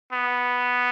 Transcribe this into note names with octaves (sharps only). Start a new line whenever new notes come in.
B3